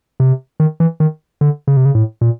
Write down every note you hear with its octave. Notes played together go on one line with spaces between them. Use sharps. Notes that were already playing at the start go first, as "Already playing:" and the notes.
C3
D#3
E3
D#3
D3
C#3
C3
C#3
A2
A#2